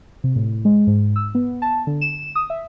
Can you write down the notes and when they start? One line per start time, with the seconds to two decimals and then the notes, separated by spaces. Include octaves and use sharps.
0.24 C3
0.36 A2
0.65 G#3
0.87 G#2
1.16 E6
1.35 B3
1.62 A5
1.87 D3
2.01 E7
2.35 D#6
2.50 E5